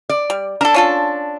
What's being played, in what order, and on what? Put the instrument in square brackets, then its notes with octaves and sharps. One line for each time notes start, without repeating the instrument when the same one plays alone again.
[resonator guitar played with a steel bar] D5
[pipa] G3
[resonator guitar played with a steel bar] D4 [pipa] A4 A#4
[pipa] C#4 F4 A4